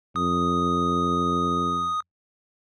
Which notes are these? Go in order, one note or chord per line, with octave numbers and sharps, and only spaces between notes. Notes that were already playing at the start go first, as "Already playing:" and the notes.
F2 D#6